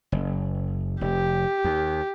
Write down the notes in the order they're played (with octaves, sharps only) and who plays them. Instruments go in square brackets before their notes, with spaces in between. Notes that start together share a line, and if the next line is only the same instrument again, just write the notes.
[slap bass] F#1
[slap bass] F1 [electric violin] G4
[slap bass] D#2